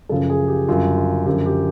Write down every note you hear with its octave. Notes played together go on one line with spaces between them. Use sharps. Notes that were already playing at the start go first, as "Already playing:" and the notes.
F#2 C#3 F3 A4
G#4
G4
F#2 D3 G3 F4
F4
F#2 D3 F3 G4
G4